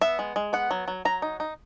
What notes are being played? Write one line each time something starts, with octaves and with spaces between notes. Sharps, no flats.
B3 E5
G#3
G#3
B3 F#5
F#3
F#3
F#3 A#5
D#4
D#4